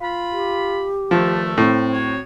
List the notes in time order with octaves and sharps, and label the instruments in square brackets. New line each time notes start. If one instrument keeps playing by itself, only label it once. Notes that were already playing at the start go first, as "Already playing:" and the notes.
[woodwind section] F4 B5
[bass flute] G4
[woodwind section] G2 D#3 A3 [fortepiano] F3
[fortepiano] A2 [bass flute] C4
[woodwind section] F#3 F#4 C#5